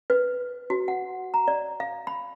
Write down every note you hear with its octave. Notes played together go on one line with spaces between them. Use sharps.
B4
F#4
F#5
A#5
D5
F5
B5